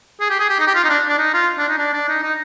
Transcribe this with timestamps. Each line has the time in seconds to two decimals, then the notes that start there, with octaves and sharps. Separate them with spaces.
0.20 G#4
0.30 G4
0.39 G#4
0.49 G4
0.59 D#4
0.67 G4
0.75 F4
0.84 D#4
0.89 D4
1.09 D4
1.18 D#4
1.33 F4
1.58 D4
1.68 D#4
1.78 D4
1.93 D4
2.08 D#4
2.23 D#4